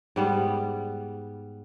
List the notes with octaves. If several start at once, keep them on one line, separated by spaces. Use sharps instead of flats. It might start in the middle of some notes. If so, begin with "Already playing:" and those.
G#2 G3 B3